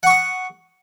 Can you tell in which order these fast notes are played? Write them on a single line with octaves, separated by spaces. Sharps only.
F#5 C#6 D#6